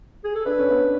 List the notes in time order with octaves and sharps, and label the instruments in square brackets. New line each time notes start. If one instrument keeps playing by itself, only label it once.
[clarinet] G#4
A4
[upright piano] D4 [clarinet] B4
[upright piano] C#4
B3 D4